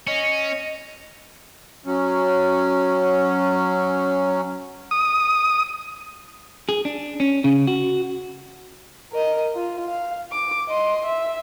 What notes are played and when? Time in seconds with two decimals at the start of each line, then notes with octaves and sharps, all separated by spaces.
0.07 C#4 D#5
1.84 F#3 C#4
4.91 D#6
6.69 G#4
6.85 D4
7.20 C#4
7.44 C#3
7.67 F#4
9.12 A#4 D#5
9.55 F4
9.88 F5
10.31 D6
10.68 D#5 C6
11.05 E5